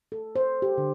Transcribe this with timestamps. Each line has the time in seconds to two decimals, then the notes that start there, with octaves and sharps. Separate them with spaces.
0.12 A4
0.36 C5
0.62 G4
0.78 D3